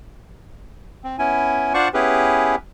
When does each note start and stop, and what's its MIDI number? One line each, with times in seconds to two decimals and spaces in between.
1.04 1.16 60
1.19 1.73 59
1.19 1.73 61
1.19 1.73 64
1.19 1.73 80
1.74 1.88 62
1.74 1.88 65
1.74 1.88 72
1.74 1.88 74
1.74 1.88 78
1.74 1.88 85
1.94 2.55 59
1.94 2.55 61
1.94 2.55 64
1.94 2.55 67
1.94 2.55 68
1.94 2.55 71